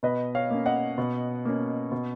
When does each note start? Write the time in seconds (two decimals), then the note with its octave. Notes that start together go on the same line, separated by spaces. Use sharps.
0.03 B2 B4 D#5
0.35 C#5 F5
0.50 A#3 C#4
0.66 D#5 F#5
0.98 B2
1.45 A#3 C#4
1.92 B2